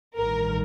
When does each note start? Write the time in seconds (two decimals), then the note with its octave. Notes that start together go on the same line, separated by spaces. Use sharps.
0.17 A1 G2 D#3 A#4